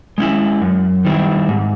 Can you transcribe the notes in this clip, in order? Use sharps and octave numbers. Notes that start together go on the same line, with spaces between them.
G#3 C#4 E4
F#2
D#3 G3 C4 E4
G#2